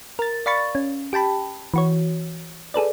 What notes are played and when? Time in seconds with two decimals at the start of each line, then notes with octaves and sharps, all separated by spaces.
0.19 A#4 A6
0.46 D5 F5 B5 C#6 A6
0.75 C#4
1.13 G4 G5 A5 B5
1.74 E3 F#4 C#5
2.74 G#4 A4 B4 D5